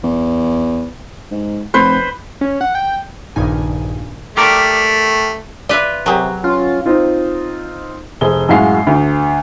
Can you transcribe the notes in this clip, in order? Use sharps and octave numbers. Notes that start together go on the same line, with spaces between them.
E2
G#2
F1 B4 C5
C#4
F#5
G5
A#1 G2 A#2 D#3 D#4 G#5
A3 G4 A#4 D5
F4 B4 D5 E5
C3 F#3 G4 G#4 A#4
C#4 F4
C4 D#4 F4
F1 G#4 C5 G7
F#2 A2 G#3 F#4 F5 C7
D2